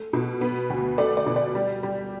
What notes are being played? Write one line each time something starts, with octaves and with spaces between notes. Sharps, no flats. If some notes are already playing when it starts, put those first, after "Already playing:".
Already playing: A3
B2
B3
D2
A3 D5
D5
B2
D5
G3
G3